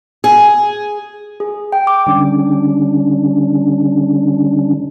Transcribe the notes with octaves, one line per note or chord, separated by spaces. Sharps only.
G#4
G#4
G5
D6
D3 G3 C#4 D4